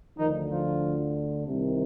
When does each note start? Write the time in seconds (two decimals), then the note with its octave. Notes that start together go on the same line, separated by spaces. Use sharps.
0.18 D2 D3 D#3 F3 D#4
0.50 F3 F4
1.45 C2 C3 D#3